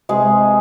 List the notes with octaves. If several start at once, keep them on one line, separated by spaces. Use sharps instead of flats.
C3 G#3 G#4